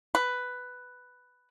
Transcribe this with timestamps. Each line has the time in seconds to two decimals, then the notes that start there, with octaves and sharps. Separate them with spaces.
0.15 B4